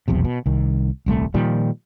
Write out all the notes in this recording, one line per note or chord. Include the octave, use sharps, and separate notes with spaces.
F1 B1 E2 C3
B2
C2 D#3
D#1 C2 A3
A#2 D#3 F3 G3